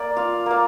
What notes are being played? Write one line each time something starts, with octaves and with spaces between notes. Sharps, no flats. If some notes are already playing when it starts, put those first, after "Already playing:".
Already playing: A#3 D5
F4 F5
A#3 F5